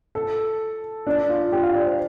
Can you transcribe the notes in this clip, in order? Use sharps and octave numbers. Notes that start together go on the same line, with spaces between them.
A4
D4
F4
G4
F5
D5
C5